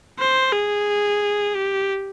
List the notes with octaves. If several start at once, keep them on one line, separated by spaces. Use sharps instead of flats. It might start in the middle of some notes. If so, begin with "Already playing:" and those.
C5
G#4
G4